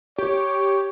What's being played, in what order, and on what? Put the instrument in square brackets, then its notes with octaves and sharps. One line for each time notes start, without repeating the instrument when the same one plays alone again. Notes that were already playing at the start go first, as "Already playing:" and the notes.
[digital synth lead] G4 [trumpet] C#5